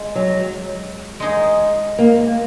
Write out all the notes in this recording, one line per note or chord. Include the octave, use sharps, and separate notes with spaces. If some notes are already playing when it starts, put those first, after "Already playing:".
Already playing: G#3
F#3
G#3 D#4 G#4
A#3
A#3